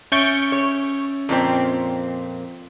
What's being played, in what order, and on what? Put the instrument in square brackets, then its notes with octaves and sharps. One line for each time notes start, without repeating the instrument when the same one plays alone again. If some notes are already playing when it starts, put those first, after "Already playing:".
[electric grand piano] C#4 E5 A6 [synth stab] C#6 G6 D7
[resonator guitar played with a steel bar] C#5
F2 A#2 C4